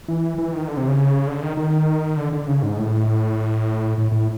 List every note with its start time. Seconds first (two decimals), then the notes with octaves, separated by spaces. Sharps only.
0.08 E3
0.38 E3
0.53 D#3
0.68 D3
0.77 C3
0.88 C#3
1.27 D3
1.42 D#3
1.57 D#3
2.17 D3
2.33 D3
2.48 C#3
2.63 G#2
2.78 A2
3.98 A2
4.12 A2